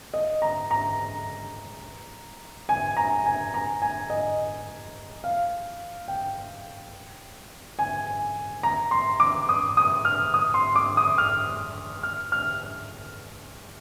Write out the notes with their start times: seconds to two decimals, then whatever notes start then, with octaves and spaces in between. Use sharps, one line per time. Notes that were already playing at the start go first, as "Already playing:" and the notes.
0.14 D#5
0.42 A#5
0.71 A#5
2.69 G#5
2.97 A#5
3.26 G#5
3.54 A#5
3.82 G#5
4.10 D#5
5.24 F5
6.08 G5
7.79 G#5
8.63 A#5
8.91 C6
9.20 D6
9.49 D#6
9.77 D#6
10.05 F6
10.34 D#6
10.54 C6
10.76 D6
10.97 D#6
11.18 F6
12.03 F6
12.32 F6